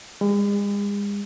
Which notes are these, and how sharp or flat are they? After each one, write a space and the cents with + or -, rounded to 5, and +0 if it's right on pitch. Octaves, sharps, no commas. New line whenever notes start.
G#3 -40